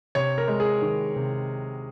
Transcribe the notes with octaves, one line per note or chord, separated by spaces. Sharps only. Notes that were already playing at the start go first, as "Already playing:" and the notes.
C3 C#5
A#4
G#3
G#4
D#3
C3